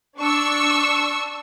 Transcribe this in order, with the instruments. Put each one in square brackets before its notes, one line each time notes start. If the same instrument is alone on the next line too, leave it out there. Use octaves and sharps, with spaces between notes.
[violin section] D4 C#6 E6